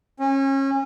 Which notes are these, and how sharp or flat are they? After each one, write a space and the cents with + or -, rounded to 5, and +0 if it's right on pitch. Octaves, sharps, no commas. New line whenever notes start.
C#4 -30